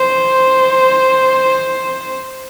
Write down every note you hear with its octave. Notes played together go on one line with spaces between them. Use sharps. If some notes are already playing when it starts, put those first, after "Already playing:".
Already playing: C5